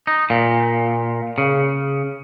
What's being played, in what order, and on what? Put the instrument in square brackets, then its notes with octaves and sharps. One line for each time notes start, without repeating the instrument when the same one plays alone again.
[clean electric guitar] D#4
A#2
C#3